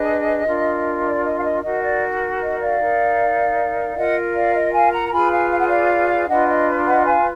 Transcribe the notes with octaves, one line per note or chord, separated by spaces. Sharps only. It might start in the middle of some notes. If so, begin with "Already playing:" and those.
Already playing: D4 G#4 B4 D#5
D4 F4 A#4
D5
D#5
F5
D#5
D#4 F#4 A#4 D#5
D5
D#5
D5 F5
D#4 A#4
F4 A#4 D#5 F#5
D5 F5
D#5
F5 G#5
F#5 A#5
A#5
F4 G#4 B4 G#5 B5
F5 G#5
F5
F#5
D5 F5
D4 F4 B4 D#5 F#5
D#5
D#5 F#5
F5 G#5